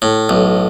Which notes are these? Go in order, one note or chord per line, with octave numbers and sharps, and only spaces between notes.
A2
B1